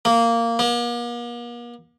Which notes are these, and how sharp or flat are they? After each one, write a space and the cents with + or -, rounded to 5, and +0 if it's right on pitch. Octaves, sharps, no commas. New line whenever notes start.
A#3 -10
A#3 +45